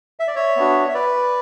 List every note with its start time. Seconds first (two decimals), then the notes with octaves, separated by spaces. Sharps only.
0.20 E5
0.28 D5
0.35 C#5 E5
0.57 B3 D4 F#4
0.88 E5
0.94 B4 D5